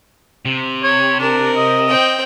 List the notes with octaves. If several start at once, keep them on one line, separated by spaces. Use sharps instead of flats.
C3
C#5
D4 A#4
D#5
C4 G5